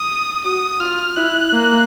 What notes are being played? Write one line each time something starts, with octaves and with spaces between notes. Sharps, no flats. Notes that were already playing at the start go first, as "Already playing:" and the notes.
Already playing: D#6
F#4 D#6
F4 F6
E4 F#6
A#3